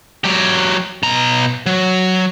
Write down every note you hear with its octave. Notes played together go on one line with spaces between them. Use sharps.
F#3 G4
B2 A#5
F#3